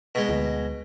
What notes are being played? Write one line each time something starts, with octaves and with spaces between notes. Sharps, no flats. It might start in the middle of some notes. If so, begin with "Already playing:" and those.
B2 G#3
D2